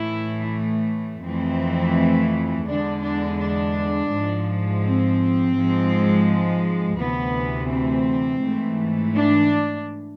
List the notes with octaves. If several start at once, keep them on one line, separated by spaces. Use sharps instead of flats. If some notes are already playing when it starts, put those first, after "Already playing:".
Already playing: A2 E3 A3 E4
F2 E3 A3 C4
E2 D3 G#3 D4
D4
D4
G#2 F3 G#3
C4
G#2 F3 G#3
D2 C3 E3 B3
C4
G#2 E3 A3
D4